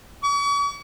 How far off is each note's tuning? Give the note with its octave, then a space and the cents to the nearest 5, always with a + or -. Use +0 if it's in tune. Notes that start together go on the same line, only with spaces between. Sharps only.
C#6 +40